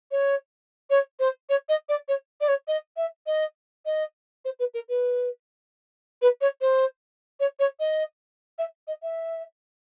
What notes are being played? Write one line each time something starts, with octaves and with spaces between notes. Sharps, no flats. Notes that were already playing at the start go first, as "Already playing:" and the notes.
C#5
C#5
C5
C#5
D#5
D5
C#5
D5
C#5
D#5
E5
D#5
D#5
C5
B4
A#4
B4
B4
C#5
C5
C#5
C#5
D#5
E5
D#5
E5